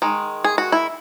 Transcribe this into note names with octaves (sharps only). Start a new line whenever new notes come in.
D#3 G#3
G#4
F#4
E4